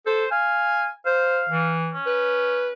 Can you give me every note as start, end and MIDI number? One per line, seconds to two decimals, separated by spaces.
0.06 0.26 69
0.06 0.28 72
0.31 0.88 77
0.31 0.93 80
1.06 1.43 72
1.06 1.73 77
1.49 1.96 52
1.94 2.70 61
2.07 2.72 71